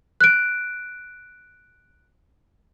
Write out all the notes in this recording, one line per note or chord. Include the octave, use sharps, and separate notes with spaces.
F#6 D7